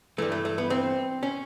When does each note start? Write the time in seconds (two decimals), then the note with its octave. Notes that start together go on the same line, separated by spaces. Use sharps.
0.18 G2 E3 A3
0.32 A3
0.45 A3
0.58 B3
0.70 C4
1.23 C#4